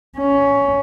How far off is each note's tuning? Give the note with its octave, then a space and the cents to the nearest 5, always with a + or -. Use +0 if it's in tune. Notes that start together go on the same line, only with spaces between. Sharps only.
C#4 +15